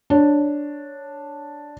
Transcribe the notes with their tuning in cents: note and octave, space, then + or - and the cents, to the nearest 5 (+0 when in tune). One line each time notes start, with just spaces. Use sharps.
D4 +0 C#5 +0